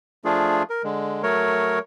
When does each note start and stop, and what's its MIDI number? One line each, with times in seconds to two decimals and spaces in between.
0.25 0.63 53
0.25 0.63 57
0.25 0.63 62
0.25 0.63 65
0.25 0.63 68
0.70 0.82 70
0.84 1.22 50
0.84 1.22 56
1.23 1.79 54
1.23 1.79 57
1.23 1.79 70
1.23 1.79 73